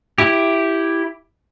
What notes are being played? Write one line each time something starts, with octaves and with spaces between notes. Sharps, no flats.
E4 G4